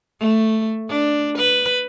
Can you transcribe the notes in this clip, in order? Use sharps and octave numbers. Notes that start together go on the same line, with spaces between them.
A3
D4
B4